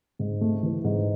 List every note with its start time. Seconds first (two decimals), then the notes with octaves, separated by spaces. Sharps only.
0.19 G#2
0.41 A3
0.63 E3
0.84 G#2